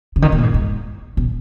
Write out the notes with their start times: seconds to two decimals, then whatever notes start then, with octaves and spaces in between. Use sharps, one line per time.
0.16 C#3
0.22 D#3
0.32 B2
0.38 A#2
0.43 G#2
0.54 G#2
1.17 B2